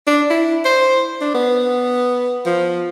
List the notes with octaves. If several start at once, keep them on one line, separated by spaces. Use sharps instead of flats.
D4
E4
C5
D4
B3
F3